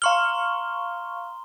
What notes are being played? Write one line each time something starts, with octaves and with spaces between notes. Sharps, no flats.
F5 A#5 C6 C#6 F6 G7